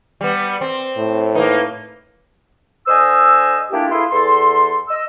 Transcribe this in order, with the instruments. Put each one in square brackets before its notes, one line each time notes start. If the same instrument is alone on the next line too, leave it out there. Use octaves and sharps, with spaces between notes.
[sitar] G3 B3
C4
[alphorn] A2
[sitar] A#3 D#4 [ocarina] B4
[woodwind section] D3 C5 D#5 G#5 D#6 E6
A3 A#3 D4 E4 F4 G4
E4 F4 G#4 A4 B4 C6
E2 A4 C6
D#5 E6